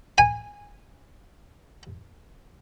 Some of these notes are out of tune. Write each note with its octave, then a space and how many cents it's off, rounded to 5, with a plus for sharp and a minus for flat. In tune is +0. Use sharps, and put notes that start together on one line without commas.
G#5 -15